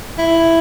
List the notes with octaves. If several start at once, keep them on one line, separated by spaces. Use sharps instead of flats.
E4